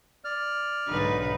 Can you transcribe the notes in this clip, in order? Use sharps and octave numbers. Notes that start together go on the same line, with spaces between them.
D5 F6
B1 G#2 D3 D#4 B4